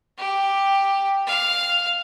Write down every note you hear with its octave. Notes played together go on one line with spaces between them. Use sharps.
G4
F5